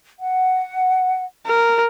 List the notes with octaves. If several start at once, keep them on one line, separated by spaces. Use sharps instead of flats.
F#5
A#4